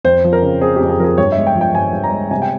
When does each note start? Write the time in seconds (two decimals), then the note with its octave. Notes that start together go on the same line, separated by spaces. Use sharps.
0.04 F2 C5
0.24 F3
0.33 A#4
0.42 C#3
0.61 C4 G#4
0.76 F2 G4
0.90 G#4
1.00 F3 A#4
1.04 G#4
1.18 G2 C#5
1.32 G#3 E5
1.47 G5
1.55 F3
1.61 G5
1.74 G2 G#5
1.93 G2
2.03 A#5
2.12 G#3
2.31 C3 G#5
2.42 G5